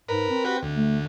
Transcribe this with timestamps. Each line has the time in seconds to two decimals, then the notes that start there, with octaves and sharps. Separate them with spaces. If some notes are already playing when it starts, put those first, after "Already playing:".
0.09 G#2 A#4 B4
0.30 C4
0.45 F#4 G4 B4
0.62 D2
0.76 A3